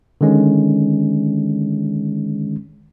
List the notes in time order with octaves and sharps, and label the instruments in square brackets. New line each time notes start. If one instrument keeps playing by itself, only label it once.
[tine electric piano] D3 D#3 G#3 C#4